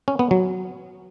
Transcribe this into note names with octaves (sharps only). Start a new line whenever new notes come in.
C#4
B3
F#3